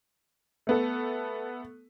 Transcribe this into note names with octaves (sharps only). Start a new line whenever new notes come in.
A3 B3 A4